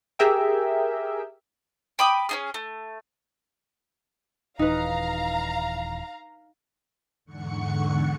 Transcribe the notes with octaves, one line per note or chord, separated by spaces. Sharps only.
G4 G#4 A#4 E5 G5
G5 B5 D6 D#6
C#4 D#4 G#4
A3
D#1 E3 D#4 B4 F5 A#5
E2 G#2 D3 F#5 C#6 C#7